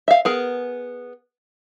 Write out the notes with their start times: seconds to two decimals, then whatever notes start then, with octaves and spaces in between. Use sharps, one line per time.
0.08 E5 F5
0.25 B3 G#4 A#4